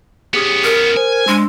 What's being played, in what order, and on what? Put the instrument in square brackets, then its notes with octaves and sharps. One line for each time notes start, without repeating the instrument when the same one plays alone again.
[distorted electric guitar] B3 C#4 [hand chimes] G4 G#4 D#6
[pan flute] A#4 [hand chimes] D#6
[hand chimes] C5 [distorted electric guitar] G#5
[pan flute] G#3 [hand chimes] D4 C6 E6